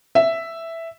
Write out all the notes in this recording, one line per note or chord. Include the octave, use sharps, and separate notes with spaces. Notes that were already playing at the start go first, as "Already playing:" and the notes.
E5